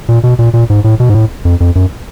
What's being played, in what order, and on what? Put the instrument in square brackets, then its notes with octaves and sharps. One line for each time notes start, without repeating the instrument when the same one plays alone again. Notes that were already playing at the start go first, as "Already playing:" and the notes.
[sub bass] A#2
B2
A#2
A#2
G#2
A2
B2
G#2
A2
F2
F2
F#2